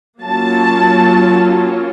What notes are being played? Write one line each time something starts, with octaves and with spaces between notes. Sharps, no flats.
F#3 A#3 C#4 F4 A5